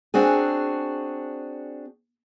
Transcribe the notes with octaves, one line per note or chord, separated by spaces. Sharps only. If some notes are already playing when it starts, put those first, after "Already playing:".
C4 D4 F#4 G#4